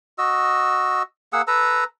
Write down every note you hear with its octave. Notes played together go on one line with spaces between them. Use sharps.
F#4 D#5 E6
A#3 G#4 F#5 E6
A4 B4 A#5 E6